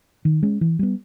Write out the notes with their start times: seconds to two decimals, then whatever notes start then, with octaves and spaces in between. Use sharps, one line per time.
0.25 D#3
0.43 G#3 C#4
0.61 E3
0.79 G3 B3